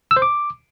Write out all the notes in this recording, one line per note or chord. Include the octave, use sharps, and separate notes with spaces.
E6
C5
D6